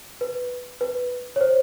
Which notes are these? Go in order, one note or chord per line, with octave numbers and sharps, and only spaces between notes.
B4
B4
C#5
C5